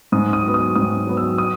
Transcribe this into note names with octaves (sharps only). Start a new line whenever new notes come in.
G#2 D#6
D#6
F#3 B3
D#6
G#2 D#6
F#3 B3
E6
D#6